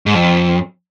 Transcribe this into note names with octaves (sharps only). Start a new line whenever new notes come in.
G#2
F2